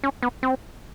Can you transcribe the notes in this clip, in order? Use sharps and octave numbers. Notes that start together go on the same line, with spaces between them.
C#4
B3
C4